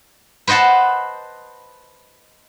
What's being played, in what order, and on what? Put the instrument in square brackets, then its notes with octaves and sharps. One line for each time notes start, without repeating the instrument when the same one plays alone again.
[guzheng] B4 C5 D#5 F#5 A5